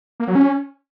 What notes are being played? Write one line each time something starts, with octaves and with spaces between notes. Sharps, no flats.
A#3
F#3
C#4